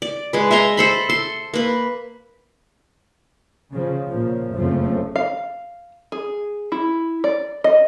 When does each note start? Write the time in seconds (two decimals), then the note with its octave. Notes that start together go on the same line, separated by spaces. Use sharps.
0.02 D5
0.33 G#3 B4
0.51 E5 G#5 A#5 C6
0.77 A4 C5 B5
1.09 A4 C6
1.54 A#3 B4
3.72 C#3 F3
4.07 A#2 C#3 F3
4.54 F#1 F2 C#3 F3 A3
5.16 F5
6.12 G#4
6.72 E4
7.24 D5
7.64 D#5